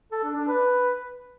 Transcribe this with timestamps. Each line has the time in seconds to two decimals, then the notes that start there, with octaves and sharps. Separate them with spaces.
0.12 A4
0.24 D4
0.36 D4
0.48 B4